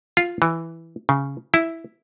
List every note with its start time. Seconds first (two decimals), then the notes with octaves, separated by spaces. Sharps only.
0.17 F4
0.42 E3
1.09 C#3
1.54 E4